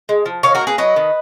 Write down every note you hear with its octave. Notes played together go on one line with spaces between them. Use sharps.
G#3
F3
D#3 C#5 F5
F#4 A#4
A#3
G#4 B4
F#3 B4 D#5
D#3